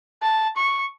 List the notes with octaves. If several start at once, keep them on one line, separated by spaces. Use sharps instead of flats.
A5
C#6